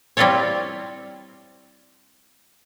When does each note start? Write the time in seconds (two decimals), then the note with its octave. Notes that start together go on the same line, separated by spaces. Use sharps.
0.17 G3 C4 E4 F4 A4 C#5